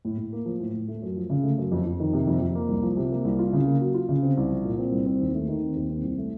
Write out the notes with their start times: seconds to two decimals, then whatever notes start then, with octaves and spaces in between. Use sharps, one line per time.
0.05 A2
0.18 A2
0.33 A#3
0.46 F3
0.60 A2
0.73 A2
0.88 A3
1.02 F#2
1.16 F3
1.30 C#3
1.43 A3
1.58 F#2
1.72 F2
1.85 F2
2.00 D#3
2.13 C3
2.27 F2
2.41 F2
2.55 A#3
2.69 C2
2.83 F3
2.97 C3
3.11 A#3
3.25 C2
3.39 F4
3.53 C#3
3.67 A#3
3.81 F#3
3.94 F4
4.09 C#3
4.22 C4
4.37 C2
4.50 F3
4.65 A#2
4.78 C4
4.92 C2
5.06 C4
5.20 D#2
5.34 A3
5.48 D#3
5.62 C4
5.76 D#2
5.89 C4
6.03 C2
6.18 A3